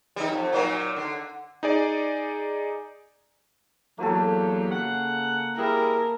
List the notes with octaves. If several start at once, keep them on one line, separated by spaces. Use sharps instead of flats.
G3 D#4
F2
A#2 F#3 D#4
D3
D#4 G#4 D5
E2 F#3 A#3 G4 A4
C#3 F#5
G3 E4 G#4 A#4